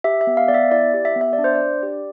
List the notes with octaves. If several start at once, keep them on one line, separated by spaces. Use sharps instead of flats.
G4 E5
E5
B3
F5
B3 D5
E5
E4 D5
G4
E5
B3
E5
D5
D4
C5
D5
D4
G4